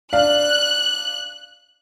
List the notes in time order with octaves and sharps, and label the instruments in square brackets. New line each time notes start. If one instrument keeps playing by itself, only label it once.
[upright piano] D4 F5 [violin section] F#6